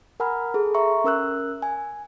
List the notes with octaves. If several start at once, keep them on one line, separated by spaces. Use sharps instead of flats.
A#4 F#5 G#5 A#5 B5 F6
G#4 A4
E5 A#5 C6 C#6
C#4 A#4 E6 F#6
G#5